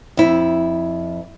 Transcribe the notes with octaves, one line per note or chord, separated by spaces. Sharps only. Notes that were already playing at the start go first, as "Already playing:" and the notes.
F2 E4